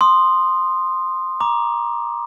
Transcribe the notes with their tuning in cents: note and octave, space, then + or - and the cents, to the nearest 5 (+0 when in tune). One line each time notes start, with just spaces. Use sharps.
C6 +0 D#6 -15
A#5 +25 D6 +0